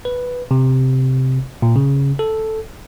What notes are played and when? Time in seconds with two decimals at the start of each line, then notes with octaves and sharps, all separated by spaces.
0.05 B4
0.51 C3
1.62 A#2
1.76 C#3
2.19 A4